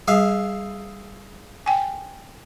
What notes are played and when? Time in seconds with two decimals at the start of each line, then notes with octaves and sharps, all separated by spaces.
0.08 G3 G#4 E5 F5
1.66 G5 G#5